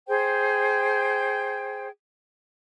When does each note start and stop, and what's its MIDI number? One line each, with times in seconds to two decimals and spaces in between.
0.08 1.88 68
0.08 1.88 72
0.08 1.88 79